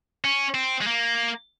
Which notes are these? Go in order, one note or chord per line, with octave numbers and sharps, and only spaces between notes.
C#4
C4
G#3
A#3